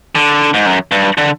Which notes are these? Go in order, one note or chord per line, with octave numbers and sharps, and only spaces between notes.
D3
G#2
F#2
G2
D3